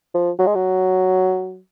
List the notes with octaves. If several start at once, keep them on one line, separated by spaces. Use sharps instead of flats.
F3
F#3
G#3
F#3